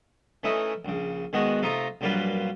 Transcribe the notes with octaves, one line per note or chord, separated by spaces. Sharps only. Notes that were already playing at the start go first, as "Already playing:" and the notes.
E3 A3 C#4 D#4 E4 D#5
A#1 C#3
D#3 G#3 B3 F#4 D#5
C3 A3 D#4 F4 D#5 A#5
A#1 F#2 G3 A#3 F4 B4